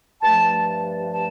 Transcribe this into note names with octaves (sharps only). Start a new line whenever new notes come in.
G2 F3 A3 A5
A5